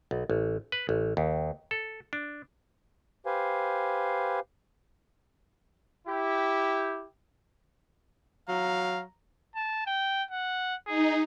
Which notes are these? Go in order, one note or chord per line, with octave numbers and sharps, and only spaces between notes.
B1
A1
B4
A1
D#2
A4
D4
G4 B4 C5 F5 G#5
E4 G4
F#3 F5 A#5
A5
G5
F#5
D#4 G#4